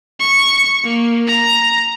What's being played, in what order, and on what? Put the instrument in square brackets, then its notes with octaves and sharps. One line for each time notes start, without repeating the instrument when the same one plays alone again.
[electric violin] C#6
A#3
A#5